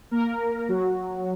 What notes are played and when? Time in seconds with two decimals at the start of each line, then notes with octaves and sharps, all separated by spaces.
0.11 A#3 A#4
0.69 F#3 F#4